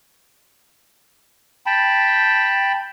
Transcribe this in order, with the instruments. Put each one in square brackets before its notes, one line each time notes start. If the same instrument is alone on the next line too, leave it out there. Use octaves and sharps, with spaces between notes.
[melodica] G5 A5 B5